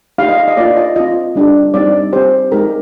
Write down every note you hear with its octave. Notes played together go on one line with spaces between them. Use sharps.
A#3 D#4 G4 F5
D#5
F5
D#5
A#3 F4 D5
D#5
C4 F4 D#5
G3 D4 G4
G3 C4 D#4 D5
C4 G4 C5
G#3 D#4 G4 A#4